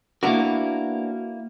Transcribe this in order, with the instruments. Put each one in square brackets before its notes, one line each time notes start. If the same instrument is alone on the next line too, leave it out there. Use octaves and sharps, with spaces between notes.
[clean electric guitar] A#3 E4 A#4 [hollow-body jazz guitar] B3 D4 F#4